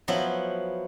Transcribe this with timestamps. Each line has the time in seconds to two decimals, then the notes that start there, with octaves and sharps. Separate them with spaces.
0.08 F3 F#3 B3 E4 F#4